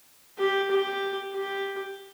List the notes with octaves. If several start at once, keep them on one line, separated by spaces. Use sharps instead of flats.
G4
G4
G4